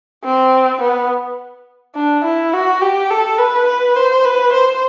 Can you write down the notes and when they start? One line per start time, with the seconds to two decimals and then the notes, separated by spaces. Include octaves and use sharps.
0.24 C4
0.81 B3
1.95 D4
2.24 E4
2.53 F#4
2.82 G4
3.10 A4
3.39 B4
3.68 B4
3.96 C5
4.25 B4
4.53 C5